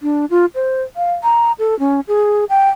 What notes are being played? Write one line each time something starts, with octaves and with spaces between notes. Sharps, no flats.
D4
F4
C5
F5
A#5
A4
C#4
G#4
G5